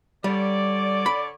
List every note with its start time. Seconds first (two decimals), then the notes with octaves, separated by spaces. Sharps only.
0.24 D3 G3 C#5 D5
1.06 B5